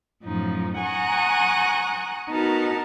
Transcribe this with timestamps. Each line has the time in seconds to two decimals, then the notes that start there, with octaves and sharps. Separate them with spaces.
0.23 F#2 A2 F3 D#4
0.80 F#5 G#5 A#5 C#6 D#6 F#6
2.29 B3 D#4 F#4 A#4 A5